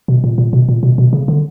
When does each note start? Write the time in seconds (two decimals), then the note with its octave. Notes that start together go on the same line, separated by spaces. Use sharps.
0.08 B2
0.24 A#2
0.38 A#2
0.53 B2
0.69 A#2
0.83 B2
0.98 B2
1.13 C#3
1.28 D3